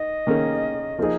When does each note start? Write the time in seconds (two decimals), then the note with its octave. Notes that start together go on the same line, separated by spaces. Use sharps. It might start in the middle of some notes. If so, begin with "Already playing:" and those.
Already playing: D#3 D#5
0.27 D#3 A#3 C#4 G#4
0.99 F3 A#3 D#4 G#4